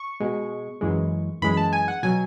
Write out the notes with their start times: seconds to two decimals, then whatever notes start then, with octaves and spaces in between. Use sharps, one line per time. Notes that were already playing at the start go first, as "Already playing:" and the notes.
Already playing: C#6
0.20 B2 G#3
0.81 F#2 E3 G#3
1.42 F#2 E3 G#3 B5
1.57 A5
1.73 G#5
1.88 F#5
2.03 B2 F#3 G#5